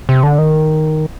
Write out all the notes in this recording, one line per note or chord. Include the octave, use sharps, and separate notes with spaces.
C3
D3
D#3